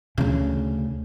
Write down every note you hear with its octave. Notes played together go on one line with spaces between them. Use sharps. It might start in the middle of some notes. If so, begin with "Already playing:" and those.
D2 C#3